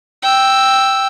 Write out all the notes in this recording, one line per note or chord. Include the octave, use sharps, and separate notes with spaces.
G5 E6